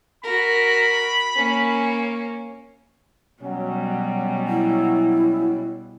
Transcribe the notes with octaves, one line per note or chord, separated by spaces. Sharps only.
F#4 A#4 B5
A#3 C#4
B2 F#3 G3 C#4
E4